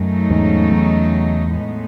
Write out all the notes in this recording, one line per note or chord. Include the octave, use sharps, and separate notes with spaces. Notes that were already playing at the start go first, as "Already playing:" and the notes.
Already playing: F#2 C#3 F#3 A3 D#4
E2 G#2
E2
A2 G#3 B3 D#4